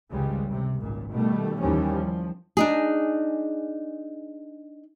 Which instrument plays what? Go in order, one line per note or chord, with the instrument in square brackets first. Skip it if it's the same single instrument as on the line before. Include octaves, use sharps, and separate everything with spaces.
[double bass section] G#1 C#2 C#3 G3 G#3
C3
G#1 C#2 A#2
B2 D#3 G3 A3
D#2 E3 F3 G3 C#4
F3
[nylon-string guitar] D4 D#4 G#4